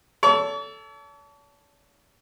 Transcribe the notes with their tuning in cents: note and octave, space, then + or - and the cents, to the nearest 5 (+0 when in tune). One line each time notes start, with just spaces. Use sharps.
A4 +0 C#5 +45